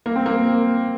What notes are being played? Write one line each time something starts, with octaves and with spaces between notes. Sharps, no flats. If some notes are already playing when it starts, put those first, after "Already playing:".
A#3
C4
A#3